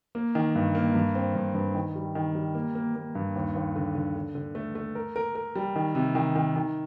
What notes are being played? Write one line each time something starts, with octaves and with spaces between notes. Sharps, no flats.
A#3
D#3
G2
A#3
G2
C4
G2
G2
D#3
G3
D#3
G3
A#3
A#3
A#3
G2
D#2
D#2
D3
D3
D3
D3
A3
A3
A#4
A#4
A#4
G3
D#3
C3
D#3
D#3
D#3